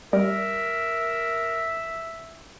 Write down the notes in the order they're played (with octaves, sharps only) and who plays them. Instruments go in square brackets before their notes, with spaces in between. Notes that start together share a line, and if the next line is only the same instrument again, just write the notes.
[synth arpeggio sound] G3 [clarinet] A#4 [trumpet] E5